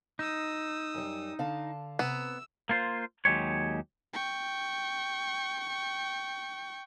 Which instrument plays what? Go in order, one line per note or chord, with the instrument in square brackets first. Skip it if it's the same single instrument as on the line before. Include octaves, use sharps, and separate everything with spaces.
[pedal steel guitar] D#4 [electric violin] D#6 E6
[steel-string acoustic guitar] F#2 G3
D3 F5 A5
[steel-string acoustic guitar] C3 [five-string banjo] B3 [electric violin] E6
[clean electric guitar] A#3 F4 C5
D#2 F#3 G#3 G4 C#5
[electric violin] G5 C#6